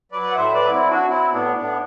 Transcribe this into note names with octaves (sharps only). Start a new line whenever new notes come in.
F#3 B4 D5
F#5
A2 C5 E5
B4 D5
F#3
C4 E4
F#3
D4 F#4
F#3 C4 E4
A2 B3 D4
A2 B3 D4